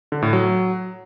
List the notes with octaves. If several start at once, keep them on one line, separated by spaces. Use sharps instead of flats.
D3
A2
F#3